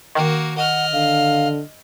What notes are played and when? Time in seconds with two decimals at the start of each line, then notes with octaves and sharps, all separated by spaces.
0.15 D#3 A#3 F#4
0.57 D#5 F#5 F6
0.93 D3 F5